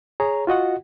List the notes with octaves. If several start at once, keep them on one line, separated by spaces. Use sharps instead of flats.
G#4 C#5 A#5
F4 F#4 D#5 F#5